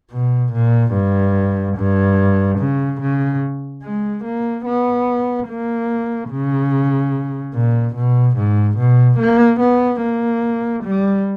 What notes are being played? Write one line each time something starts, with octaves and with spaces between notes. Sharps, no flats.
B2
A#2
G2
G2
C#3
C#3
G#3
A#3
B3
A#3
C#3
A#2
B2
G#2
B2
A#3
B3
A#3
G3